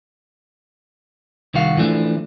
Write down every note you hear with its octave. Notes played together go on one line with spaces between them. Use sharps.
C2 D#3 F#4 F5
E3 F3 A3 D4